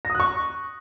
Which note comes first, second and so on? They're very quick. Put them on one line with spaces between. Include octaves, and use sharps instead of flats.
A#6 D#6 F#6 C#6